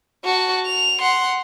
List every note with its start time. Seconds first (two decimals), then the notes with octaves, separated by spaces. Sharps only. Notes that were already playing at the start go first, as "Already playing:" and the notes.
0.24 F#4 A5
0.66 F7
1.01 F#5 C6